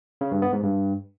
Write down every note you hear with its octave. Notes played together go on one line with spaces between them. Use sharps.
C#3
G2
B3
G#2
G2